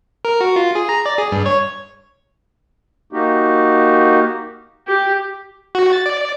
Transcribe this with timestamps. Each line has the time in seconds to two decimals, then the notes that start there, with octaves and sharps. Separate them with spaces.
0.25 A#4
0.41 F#4
0.56 F4
0.75 G#4
0.89 A#5
1.06 D5
1.18 G#4
1.32 G2
1.46 C#5
3.13 A#3 D#4 F#4 G4
4.88 G4
5.75 F#4
5.93 A6
6.06 D5